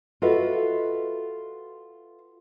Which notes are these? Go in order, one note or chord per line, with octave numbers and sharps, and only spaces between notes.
F4 F#4 A4 B4 D#5 E5